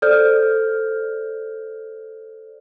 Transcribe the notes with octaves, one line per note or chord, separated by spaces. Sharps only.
A4 C5 D5 F6 G6